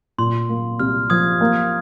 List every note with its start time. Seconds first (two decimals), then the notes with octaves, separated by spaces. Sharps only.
0.18 A#2 C6
0.49 A#3
0.79 C2 F6
1.10 F3 D#6 G#6
1.41 A#3